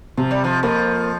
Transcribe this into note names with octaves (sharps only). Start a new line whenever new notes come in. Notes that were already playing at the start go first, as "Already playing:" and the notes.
C3 F3
G3
F2 F3
F2 F3 A#3